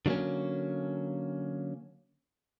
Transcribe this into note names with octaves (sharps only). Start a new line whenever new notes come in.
D3 F#3 G3 A#3 C#4